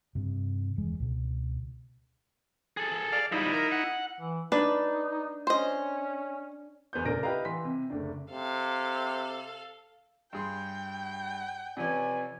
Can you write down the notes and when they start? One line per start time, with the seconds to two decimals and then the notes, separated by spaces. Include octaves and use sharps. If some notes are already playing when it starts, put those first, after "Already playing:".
0.15 G2 C3
0.76 D#1 E2 G#3
1.00 C#2 B2
2.77 G#4 A4
3.12 D5 F5
3.32 F3 G3 D#4 E4
3.52 A#4
3.72 F#5
4.19 E3
4.52 D4 D#4 B4
5.47 C#4 C5 D#5
6.93 E2 B3 C5 G6
7.05 D#1 D2 D4 A#4 A#6 D7
7.23 E4 G4 B4 D#5 F5 A#5
7.45 E3 C6 B6
7.65 C3
7.90 F#1 D2 D4
8.31 C3 A4 F5
10.33 G2 G#4 G5 C6
11.77 C3 F3 C#4 B4 D5 G#5